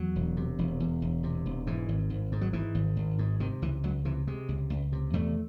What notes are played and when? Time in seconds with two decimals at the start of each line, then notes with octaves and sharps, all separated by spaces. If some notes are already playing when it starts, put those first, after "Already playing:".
Already playing: E2 F#3
0.16 E1
0.37 C3
0.58 E1
0.80 E2
1.02 E1
1.24 C3
1.46 E1
1.67 G#2 E3
1.89 G#1
2.10 G#1
2.32 G#2
2.41 F#3
2.53 G#2 E3
2.75 G#1
2.96 G#1
3.19 G#2
3.40 C3 D#3
3.62 C#2 E3
3.84 C#2 F#3
4.05 C3 E3
4.27 C3 G#3
4.49 C#2
4.70 C#2
4.92 C3
5.13 E2 A3